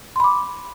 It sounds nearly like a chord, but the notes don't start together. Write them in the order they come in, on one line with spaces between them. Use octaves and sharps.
C6 B5 D6